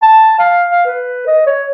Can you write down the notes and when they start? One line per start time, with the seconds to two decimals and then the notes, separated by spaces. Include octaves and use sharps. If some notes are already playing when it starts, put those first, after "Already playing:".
0.02 A5
0.39 F5
0.70 F5
0.86 B4
1.27 D#5
1.46 C#5